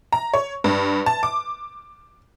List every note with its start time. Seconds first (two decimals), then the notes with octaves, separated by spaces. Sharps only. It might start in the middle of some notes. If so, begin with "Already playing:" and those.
0.13 A#5
0.34 C#5
0.64 G2
1.06 A5
1.23 D6